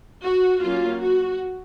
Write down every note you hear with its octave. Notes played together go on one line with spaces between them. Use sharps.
F#4
F#3 A#3 C#4 F4
F#4